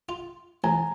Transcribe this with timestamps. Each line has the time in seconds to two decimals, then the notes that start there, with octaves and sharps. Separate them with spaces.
0.09 F4
0.64 A1 G#5 A#5